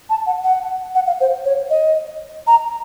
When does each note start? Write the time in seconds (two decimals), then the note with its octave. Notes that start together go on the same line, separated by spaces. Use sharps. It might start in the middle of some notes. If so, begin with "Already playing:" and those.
0.10 A5
0.26 F#5
0.44 F#5
0.95 F#5
1.07 F5
1.20 C5
1.45 C#5
1.70 D#5
2.47 A#5